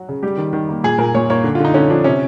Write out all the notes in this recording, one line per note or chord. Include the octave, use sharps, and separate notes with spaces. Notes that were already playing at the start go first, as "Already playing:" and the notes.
Already playing: F#3 F#4
C#3
G3 G4
D#3
D#3
A#3
A#2 G#4
A#2 A#4
A#2 C#5
A#3 C#5
D3
F4
D3 D#4
D3 C#4
F3 D4
C3 C#4